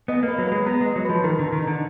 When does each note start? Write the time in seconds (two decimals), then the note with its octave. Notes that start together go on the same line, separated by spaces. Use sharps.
0.08 B3 D#5
0.23 A#3
0.28 B4
0.38 F#3
0.48 G#3 B4
0.66 B3 A#5
0.81 G#3 D#5
0.96 F#3
1.05 F3 B4
1.24 D#3 A#4
1.39 D3 A#5
1.52 D#3
1.63 D3 D#4